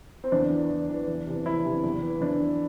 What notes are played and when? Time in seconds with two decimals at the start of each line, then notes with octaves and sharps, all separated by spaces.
0.24 C4
0.32 E2 D4
0.50 E3
0.70 E2
0.89 E3
1.07 E2
1.26 C3 E3
1.46 E2 E4
1.64 C3 E3
1.84 E2
2.02 E3
2.21 E2 D4
2.41 E3